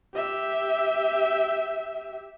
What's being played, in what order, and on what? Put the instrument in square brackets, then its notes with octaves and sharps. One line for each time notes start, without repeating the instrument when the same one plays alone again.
[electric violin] G4 E5